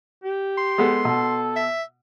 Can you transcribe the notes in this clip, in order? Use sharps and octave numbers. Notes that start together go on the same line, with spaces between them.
G4
C6
G#3 B3 A4
B2 A4
E5